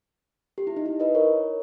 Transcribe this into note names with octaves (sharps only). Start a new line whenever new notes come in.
G4
E4
D#4
E4
B4 D#5
A#4 C#5